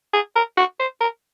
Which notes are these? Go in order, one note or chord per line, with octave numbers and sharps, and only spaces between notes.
G#4
A#4
F#4
C5
A#4